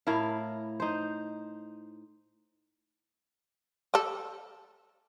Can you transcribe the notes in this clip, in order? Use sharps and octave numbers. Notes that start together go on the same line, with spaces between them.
A2 E4 A#4 F5
D#4 C5
G4 A4